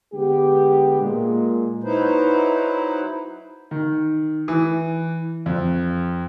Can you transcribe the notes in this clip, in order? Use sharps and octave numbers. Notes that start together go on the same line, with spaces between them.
D3 G#3 B3 G4
A#2 G#3
F#3 D#4 E4 B4 C5
D#3
E3
F2